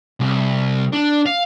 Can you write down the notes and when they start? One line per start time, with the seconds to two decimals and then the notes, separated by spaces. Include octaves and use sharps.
0.20 C2
0.93 D4
1.26 F5